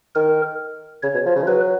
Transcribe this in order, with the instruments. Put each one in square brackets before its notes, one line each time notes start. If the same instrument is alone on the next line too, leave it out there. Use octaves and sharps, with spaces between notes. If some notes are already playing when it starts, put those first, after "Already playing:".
[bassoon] D#3 [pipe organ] A#4
[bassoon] C#3 [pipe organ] C#5
[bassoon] B2
F3
C#3
F3
[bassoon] F#3 [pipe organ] B4